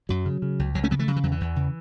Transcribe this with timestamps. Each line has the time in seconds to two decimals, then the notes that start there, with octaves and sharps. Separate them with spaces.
0.09 F#2 F#3
0.26 C#3
0.42 C#3
0.59 C#2
0.74 C#2 F#3
0.84 A3 C#4
0.91 C#3 F#3 B3
0.99 E3 A3
1.08 C#3 F#3
1.16 E3
1.23 E2 F#3
1.32 E3
1.41 E2
1.56 C#3